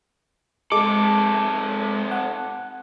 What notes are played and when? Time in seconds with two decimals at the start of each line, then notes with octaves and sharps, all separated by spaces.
0.72 C3 G#3 A4 D6
2.11 F#5